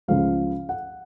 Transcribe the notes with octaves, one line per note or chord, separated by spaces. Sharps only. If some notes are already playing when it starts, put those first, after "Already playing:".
C#2 C#3 F3 G#3 F5
F#5